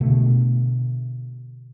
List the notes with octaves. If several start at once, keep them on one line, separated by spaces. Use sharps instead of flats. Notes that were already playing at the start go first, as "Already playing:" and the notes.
B2 D3 A3